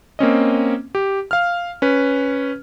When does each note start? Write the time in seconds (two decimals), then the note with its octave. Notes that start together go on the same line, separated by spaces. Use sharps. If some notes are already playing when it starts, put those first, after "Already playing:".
0.19 A#3 C4 C#4 D#5
0.95 G4
1.31 F5 F6
1.82 C#4 B4